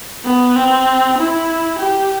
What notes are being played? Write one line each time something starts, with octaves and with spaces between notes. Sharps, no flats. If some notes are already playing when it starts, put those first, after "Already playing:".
B3
C4
E4
G4